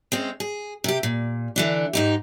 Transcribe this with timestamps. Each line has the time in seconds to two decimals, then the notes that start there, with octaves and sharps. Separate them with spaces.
0.12 G#3 C4 C#4
0.40 G#4
0.84 C3 G4
1.03 A#2
1.56 D3 E3 D4
1.93 G#2 D#4 G4